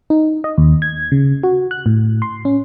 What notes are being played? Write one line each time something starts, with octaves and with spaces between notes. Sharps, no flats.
D#4
D#5
D#2
G#6
C#3
F#4
F#6
A2
C6
C#4